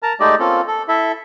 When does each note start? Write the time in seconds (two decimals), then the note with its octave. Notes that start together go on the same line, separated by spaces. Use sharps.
0.03 A#4 A5 A#5
0.20 G#3 A3 D#4 G4 D5 D#5
0.39 A#3 C4 C#4 F4 A4
0.67 A4
0.88 E4 A4 E5